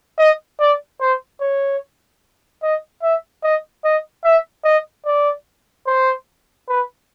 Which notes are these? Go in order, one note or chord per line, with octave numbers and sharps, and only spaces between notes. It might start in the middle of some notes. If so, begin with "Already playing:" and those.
D#5
D5
C5
C#5
D#5
E5
D#5
D#5
E5
D#5
D5
C5
B4